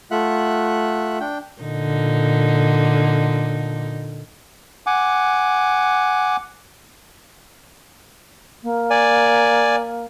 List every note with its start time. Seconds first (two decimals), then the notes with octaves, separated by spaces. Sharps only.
0.11 A3 F4 E5 F#5 F#6
1.20 D4 G5
1.61 A#2 D3 D#4
4.86 F#5 G#5 D6
8.63 A#3
8.90 D5 G#5